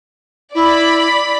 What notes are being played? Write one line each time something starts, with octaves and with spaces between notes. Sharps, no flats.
E4 D5 B5